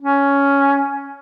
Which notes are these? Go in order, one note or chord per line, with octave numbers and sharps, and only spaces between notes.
C#4